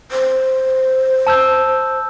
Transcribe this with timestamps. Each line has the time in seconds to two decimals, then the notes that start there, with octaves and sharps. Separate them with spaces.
0.11 C5
1.27 A5 E6 G6